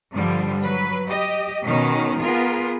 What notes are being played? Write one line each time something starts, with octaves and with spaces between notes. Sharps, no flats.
G2 D3 F3 G3
F#3 B4
G4 D#5
B2 D#3 C#4 D#4
B3 F4 G#4 A#4